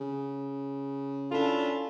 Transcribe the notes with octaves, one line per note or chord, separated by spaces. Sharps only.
C#3
C#4 D4 E4 F4 A4